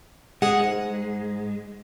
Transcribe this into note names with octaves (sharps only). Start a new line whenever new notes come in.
G#3 G#4 F#5
G#2